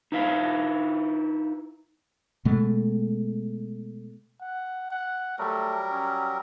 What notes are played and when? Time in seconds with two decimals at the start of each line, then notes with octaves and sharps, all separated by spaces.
0.12 D#4 E4 B4 F5
2.45 B2 G#3 A3
4.41 F#5
4.91 F#5
5.38 F#3 G3 A3 A#4
5.91 C#4